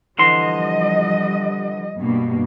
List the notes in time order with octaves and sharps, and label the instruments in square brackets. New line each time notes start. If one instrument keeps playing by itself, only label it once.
[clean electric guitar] D3 E3 C6 [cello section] F3 G3 D#5
[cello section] G2 B2 A#3